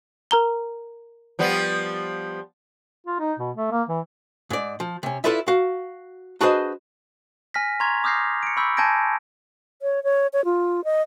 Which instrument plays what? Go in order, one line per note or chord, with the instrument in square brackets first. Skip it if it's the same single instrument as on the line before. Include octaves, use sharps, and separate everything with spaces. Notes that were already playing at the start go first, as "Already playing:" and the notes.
[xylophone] A#4 A#5 G7
[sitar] F3 G3 B3
[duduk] F4
D#4
B2
A3
A#3
E3
[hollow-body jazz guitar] G#2 D5
F3
C3 C#4
E4 F4 A4 B4 D5 E5
F#4 F5
D4 F#4 G#4 B4 C5 D#5
[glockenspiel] G#5 F6 A#6 B6
A#5 C6 C#6 F6 G#6 F7
D6 D#6 F6 G6 A#6 C7
C#7 D7
B5 C#6 E6 G6 B6
G#5 A5 G6 G#6 A#6 D7
[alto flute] C#5
C#5
C#5
F4
D#5